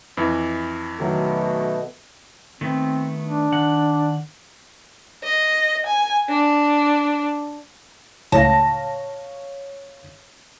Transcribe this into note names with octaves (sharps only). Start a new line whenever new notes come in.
F2 E3
B2 D#3 F#3 A3
D#3 A3 B3 C4
D4
D#3 F#5
D#5
G#5
D4
C#2 A2 C#5 F5 A5 A#6